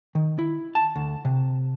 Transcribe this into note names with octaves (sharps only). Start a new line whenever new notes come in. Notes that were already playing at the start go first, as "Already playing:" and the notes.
D#3
E4
A5
D2
C3